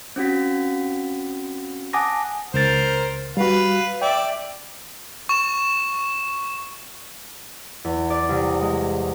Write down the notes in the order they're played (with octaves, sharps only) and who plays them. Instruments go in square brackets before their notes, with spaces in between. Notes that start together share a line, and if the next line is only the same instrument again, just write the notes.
[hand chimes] C4 C#4 F#4 B6
F#5 G#5 A5 D6 D#6 A#6
[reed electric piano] C#2 A6 [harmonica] A#4 C5
[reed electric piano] G3 F#4 [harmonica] B4 F5
[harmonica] D5 E5 [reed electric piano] G5
[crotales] C#6 E7
[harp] E2
D5
C2
G#3